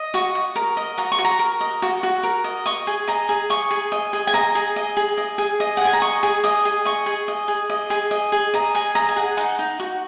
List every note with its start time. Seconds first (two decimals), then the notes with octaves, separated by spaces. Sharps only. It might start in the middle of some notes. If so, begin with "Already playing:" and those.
Already playing: D#5
0.14 F#4 C#6
0.35 F#4
0.56 A#4
0.77 D#5
0.98 F#4 A#5
1.12 C#6
1.18 F#4
1.24 A#5
1.39 A#4
1.61 D#5
1.82 F#4
2.03 F#4
2.23 A#4
2.44 D#5
2.66 D#5 C#6
2.87 G#4
3.08 D#5 A#5
3.29 G#4
3.50 D#5 C#6
3.71 G#4
3.92 D#5
4.13 G#4
4.27 G#5
4.34 D#5 A#5
4.55 G#4
4.76 D#5
4.97 G#4
5.18 D#5
5.38 G#4
5.60 D#5
5.77 F#5
5.81 G#4 G#5
5.93 A#5
6.02 D#5 C#6
6.23 G#4
6.44 D#5 D#6
6.65 G#4
6.85 D#5 C#6
7.06 G#4
7.28 D#5
7.48 G#4
7.70 D#5
7.90 G#4
8.11 D#5
8.32 G#4
8.54 D#5 A#5
8.75 G#4 G#5
8.95 D#5 A#5
9.09 G#5
9.16 G#4 F#5
9.37 D#4 F#5
9.59 D#4
9.80 F#4